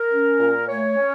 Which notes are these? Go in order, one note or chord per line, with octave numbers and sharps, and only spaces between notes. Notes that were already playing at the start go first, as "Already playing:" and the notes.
Already playing: A#4
C#4
A#2
A3 C#5
C#4